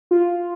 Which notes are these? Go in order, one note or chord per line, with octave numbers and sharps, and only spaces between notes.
F4